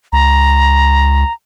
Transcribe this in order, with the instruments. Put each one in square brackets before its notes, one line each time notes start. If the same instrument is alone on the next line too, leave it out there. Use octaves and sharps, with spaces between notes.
[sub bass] C#2 [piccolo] A#5